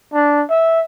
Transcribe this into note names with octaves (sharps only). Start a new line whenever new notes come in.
D4
E5